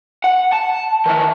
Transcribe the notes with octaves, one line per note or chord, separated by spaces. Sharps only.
F#5
A5
D#3 E3